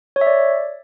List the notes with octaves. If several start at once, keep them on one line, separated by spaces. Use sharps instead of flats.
C#5
E5
D5